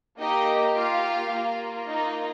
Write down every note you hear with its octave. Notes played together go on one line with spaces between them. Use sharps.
A#3 D#4 G4 D#5
F4 F5
A#3 F4
D#4 D#5